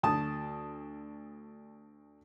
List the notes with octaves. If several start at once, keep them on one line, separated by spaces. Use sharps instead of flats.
D2 A5 D#6